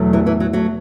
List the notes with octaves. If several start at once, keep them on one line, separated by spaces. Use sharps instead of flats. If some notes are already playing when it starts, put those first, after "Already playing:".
Already playing: E2 B2 F#3 A3
E3 G3
E3
F#3
F#3 A3